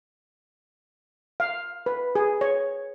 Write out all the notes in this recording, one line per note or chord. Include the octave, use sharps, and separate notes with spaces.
F5
B4
G#4
C#5